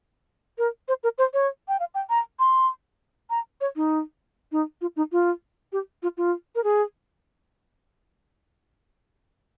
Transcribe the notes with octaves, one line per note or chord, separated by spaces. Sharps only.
A#4
C5
A#4
C5
C#5
G5
F5
G5
A#5
C6
A#5
C#5
D#4
D#4
F4
D#4
F4
G4
F4
F4
A#4
G#4